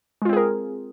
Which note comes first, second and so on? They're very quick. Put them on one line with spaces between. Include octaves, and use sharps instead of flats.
G#3 F4 C4 G#4 A#4